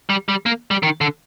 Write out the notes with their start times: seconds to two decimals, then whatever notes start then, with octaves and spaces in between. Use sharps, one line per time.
0.10 G3
0.29 G3
0.46 A#3
0.71 G3
0.83 D#3
1.01 D3